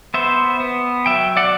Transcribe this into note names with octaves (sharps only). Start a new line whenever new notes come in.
B3 C5 E5
B3
F#3 E5 G5
D5 F#5